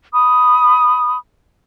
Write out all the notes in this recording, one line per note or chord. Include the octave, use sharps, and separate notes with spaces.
B5 D#6